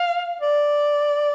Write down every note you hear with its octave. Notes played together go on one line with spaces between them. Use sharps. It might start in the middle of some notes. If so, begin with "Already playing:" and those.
Already playing: F5
D5